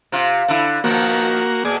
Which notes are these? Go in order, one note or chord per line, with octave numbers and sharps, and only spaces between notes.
C3 F4
D3 E4
B2 D#3 F3 A#3 F#4
B2 G#4 D5